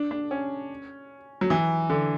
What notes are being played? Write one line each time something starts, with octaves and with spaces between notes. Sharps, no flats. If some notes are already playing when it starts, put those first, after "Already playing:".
Already playing: D4
D4
C#4
F#3
E3
D3